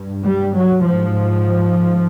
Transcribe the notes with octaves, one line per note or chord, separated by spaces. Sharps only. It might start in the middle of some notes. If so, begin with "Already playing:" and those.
Already playing: G2
G3
F#3
G#2 F3